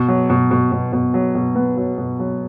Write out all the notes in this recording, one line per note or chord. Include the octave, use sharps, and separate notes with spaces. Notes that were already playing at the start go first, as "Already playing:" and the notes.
Already playing: B2
F#3
B2
B2
B2
B2
F#3
B2
B3
F#3
B2
F#3